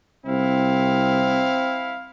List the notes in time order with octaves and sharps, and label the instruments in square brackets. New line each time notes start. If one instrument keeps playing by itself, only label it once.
[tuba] C2 [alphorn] C4 [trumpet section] E4 F5